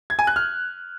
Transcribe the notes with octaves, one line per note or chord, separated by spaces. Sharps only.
G#6
G#5
F#6
F6